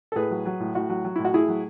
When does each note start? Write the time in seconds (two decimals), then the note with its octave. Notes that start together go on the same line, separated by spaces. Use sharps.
0.12 A4
0.16 A2 G#4 B4
0.31 F#3
0.46 F#3
0.60 A2
0.75 A2 F#4
0.90 F#3
1.04 F#3
1.16 A2 E4
1.25 F#4
1.34 A2 E4 G#4
1.48 F#3